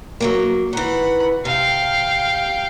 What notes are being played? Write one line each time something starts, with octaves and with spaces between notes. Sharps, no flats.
F#3 G#3 A#3
D#3 E3 F#5 B5
C3 F5 G5